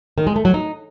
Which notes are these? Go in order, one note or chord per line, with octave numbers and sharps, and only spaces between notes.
D#3
G#3
A3
F#3
D#4